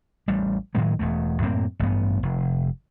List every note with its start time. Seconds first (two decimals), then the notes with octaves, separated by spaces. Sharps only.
0.28 A1 G3
0.75 A2 D#3 F#3 G#3
0.99 E1 E2 A3
1.42 F#2 A2 A#3 C4
1.79 A1 G2 B3
2.23 F1